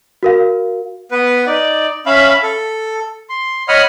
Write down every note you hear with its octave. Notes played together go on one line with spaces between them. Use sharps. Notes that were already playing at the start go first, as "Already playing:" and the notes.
F#4 A#4 F5
B3 B4
D#4 D5
C#4 E5 F5 B5
A4
C6
C#5 D#5 F#5 B5 D#6 F6